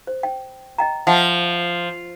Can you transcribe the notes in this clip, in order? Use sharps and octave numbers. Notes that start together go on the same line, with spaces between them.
C5
G5
D#5 G5 A#5
F3 E5 F#5